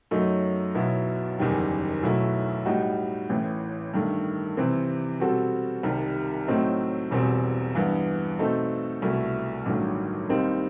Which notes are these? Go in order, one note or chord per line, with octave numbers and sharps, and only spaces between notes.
F#2 F#3 A3 D#4
B1 B2 F#3 B3 E4
F#1 E2 D#3 G3
B1 B2 F#3 A3 E4
A2 G3 D#4 F#4
A1 A2 E3
G2 D#3 A3
C3 E3 G3 C4
B2 G3 C4 F#4 A4
C2 C3 D#3 G3
A2 F#3 A3 C4 D#4
E1 E2 B2 G3 C4
G2 E3 B3
B2 A3 C4 D#4 A4
C2 B2 A3 E4
A1 G2 D#3 F#3 A3
D#2 D#3 G3 C4 D#4